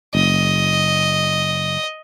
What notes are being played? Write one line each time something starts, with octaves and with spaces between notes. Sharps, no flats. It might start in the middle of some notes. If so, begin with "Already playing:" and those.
F#1 D#5